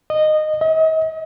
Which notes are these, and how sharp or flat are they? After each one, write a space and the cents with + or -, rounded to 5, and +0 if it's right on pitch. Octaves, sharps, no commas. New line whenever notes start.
D#5 -15
D#5 +40